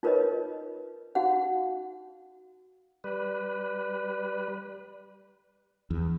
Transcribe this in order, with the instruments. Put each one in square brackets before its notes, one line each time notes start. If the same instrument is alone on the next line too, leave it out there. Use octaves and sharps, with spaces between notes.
[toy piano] D#4 F4 A#4 B4 C#5 D#5
D#4 F#4 F5 F#5
[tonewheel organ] G3 B4
[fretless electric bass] E2